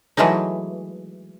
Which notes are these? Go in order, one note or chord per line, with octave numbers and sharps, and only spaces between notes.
E3 F#3 G#3 A3 D#4